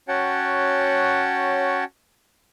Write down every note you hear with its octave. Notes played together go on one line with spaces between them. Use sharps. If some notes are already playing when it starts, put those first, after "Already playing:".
C#4 F#4 C#5 F#5 G5 A5